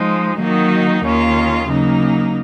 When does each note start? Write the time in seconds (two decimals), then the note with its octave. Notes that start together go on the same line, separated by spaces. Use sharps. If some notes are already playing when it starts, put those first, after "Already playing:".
Already playing: F3 G#3 D#4
0.39 D#3 F#3 A#3 D#4 F#4
1.04 D#2 D#3 A#3 C#4 F4
1.69 C#3 F#3 A#3 D#4